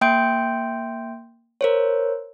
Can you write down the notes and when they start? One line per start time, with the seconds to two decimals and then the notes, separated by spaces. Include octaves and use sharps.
0.01 A#3 E5 G5 C6 G6 D7
1.61 A#4 C5 C#5